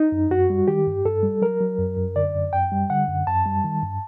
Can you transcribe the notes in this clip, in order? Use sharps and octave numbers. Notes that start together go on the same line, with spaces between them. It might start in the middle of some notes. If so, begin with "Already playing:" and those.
Already playing: D#4
F#2
F#2 F#4
G3
D#3 G4
G2
G2 A4
G3
F#3 A#4
F#3
F#2
F#2
D3 D5
F#2
F#2 G5
G3
D3 F#5
F#2
F#2 A5
G3
D#3
G2